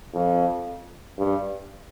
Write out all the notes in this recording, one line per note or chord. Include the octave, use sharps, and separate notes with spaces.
F2
G2